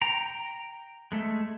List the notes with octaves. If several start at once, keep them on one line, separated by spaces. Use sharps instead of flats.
G5 A#5
G#3 A3 E5